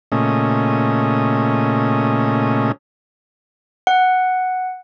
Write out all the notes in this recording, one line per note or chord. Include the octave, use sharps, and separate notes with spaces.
A#2 C#3 A3 C#4 D#5
F#5